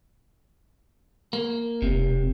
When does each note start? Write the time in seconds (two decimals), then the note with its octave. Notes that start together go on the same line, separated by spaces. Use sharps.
1.33 A#3
1.82 E1 C3